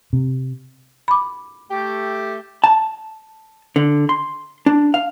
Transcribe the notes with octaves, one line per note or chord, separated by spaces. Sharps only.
C3
B5 D6
A3 G4
A5
D3
C6
D4
F5